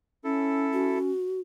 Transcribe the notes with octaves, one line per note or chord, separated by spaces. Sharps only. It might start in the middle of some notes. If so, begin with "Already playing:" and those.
C#4 E4 A4
F#4